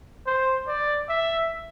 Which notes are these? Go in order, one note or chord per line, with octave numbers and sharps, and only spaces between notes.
C5
D5
E5